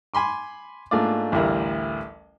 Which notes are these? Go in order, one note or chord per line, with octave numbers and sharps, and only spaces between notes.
G#5 B5 C6 D6
G#2 A3 A#3 D4 F4 D5
A1 D2 G3 E4 A#4 F5